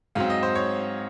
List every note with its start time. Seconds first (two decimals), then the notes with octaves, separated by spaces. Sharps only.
0.15 G#2 F#3 C4 F5
0.30 D#5
0.43 C5
0.55 C#5